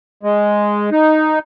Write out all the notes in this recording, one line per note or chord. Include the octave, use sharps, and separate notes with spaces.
G#3
D#4